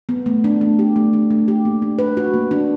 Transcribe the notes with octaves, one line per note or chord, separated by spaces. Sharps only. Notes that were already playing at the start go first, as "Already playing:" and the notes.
B3
A3
D4
A3
G4
A3
D4
A3
G4
A#3
D4
B4
F#4
A#3
D4